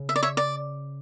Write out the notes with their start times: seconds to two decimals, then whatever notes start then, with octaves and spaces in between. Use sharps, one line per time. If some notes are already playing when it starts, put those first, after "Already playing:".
Already playing: C#3
0.09 E5
0.16 D5
0.23 C#5 E5
0.37 D5